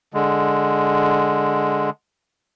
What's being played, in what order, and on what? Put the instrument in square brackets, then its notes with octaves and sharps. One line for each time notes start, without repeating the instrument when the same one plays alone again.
[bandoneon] D3 G#3